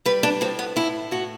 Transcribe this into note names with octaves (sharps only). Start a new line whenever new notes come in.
G3 B4
D4
A2 C4
B3
A2 E4
A2 F#4